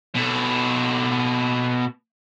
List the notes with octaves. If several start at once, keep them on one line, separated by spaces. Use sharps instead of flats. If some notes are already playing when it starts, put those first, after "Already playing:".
B2 A4